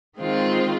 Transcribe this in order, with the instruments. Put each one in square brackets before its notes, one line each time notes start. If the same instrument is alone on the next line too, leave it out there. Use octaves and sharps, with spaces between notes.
[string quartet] D#3 G#3 C4 F4